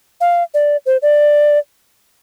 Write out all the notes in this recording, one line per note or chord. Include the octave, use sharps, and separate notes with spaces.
F5
D5
C5
D5